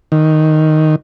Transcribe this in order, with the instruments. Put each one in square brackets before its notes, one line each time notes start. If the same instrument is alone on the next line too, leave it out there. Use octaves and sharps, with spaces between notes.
[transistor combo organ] D#3